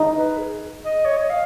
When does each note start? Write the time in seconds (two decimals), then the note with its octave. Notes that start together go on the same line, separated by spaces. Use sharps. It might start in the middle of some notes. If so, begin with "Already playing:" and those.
Already playing: D#4
0.15 B4
0.38 G#4
0.84 D#5
1.05 C#5
1.18 D#5
1.30 F5